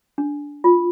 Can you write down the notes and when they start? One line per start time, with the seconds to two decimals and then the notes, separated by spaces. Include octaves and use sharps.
0.18 D4
0.64 F4